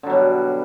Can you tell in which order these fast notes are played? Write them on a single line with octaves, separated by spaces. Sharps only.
D3 F#3 B2 G3